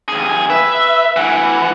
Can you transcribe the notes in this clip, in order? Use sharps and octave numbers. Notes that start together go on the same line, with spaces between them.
D#2 G#4
B4 E5
D2 E3 F#5